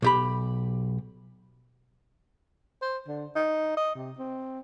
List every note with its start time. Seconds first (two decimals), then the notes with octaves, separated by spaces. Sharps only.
0.02 B1 G4 B5
2.82 C5
3.08 D3
3.36 D#4
3.77 D#5
3.95 C3
4.18 C4